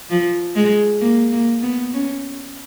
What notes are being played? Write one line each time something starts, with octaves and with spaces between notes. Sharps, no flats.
F3
G#3
A#3
A#3
B3
C#4